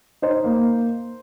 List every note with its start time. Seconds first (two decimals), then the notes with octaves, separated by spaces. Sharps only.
0.22 D#4 C5
0.44 A#3